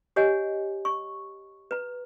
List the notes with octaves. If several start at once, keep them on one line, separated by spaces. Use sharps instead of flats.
G4 C#5 D#5 F#5 G#5
C#6
B4 A#5